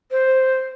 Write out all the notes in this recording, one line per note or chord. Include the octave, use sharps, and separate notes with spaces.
C5